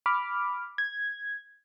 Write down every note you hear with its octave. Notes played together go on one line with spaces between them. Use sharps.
B5 D6 F6
G#6